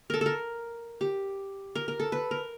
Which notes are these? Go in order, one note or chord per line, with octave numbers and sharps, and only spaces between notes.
A4 A#4
A4 A#4
G4
A#4
A#4
A4
B4
A#4